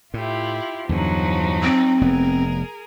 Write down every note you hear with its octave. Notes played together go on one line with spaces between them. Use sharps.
A2 E4 F4 G4
E2 G2 D3 F3 F#3 D#4
C4
F1 B3 G#4 A#4